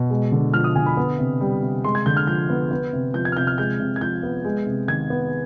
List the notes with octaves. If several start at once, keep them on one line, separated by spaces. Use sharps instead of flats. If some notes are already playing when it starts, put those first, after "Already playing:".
Already playing: B2
G#3
D3
F3 F6
D#6
D3 G#5
B5
B3
C3
G3
C3
G#3 C6
G#6
D3 G6
F6
F3 G6
B3
B3
C3
F3 G6
G#6
F6
C3 G6
F6
G#3 G6
C3
G#6
F3 G6
B3
G#3
C3
D#3 G#6
B3